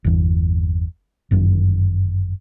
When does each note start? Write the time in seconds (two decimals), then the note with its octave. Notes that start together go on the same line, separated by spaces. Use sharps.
0.04 G1 E2
1.31 G1 F#2 C3 D#3